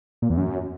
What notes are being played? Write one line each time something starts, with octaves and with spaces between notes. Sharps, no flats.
A#2
E2
F#2